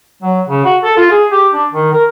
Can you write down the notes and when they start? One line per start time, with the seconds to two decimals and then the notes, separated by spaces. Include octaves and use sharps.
0.22 F#3
0.48 C#3
0.65 F#4
0.83 A4
0.97 F4
1.11 G#4
1.32 G4
1.53 D4
1.72 D#3
1.93 A#4